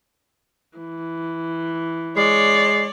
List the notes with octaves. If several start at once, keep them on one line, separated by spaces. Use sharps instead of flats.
E3
G#3 C#5 D5 C7